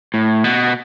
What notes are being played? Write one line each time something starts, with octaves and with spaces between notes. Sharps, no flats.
A2
B2